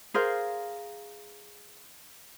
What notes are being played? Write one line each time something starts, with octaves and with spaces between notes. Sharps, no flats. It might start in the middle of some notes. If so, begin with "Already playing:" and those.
G#4 A#4 C5 F5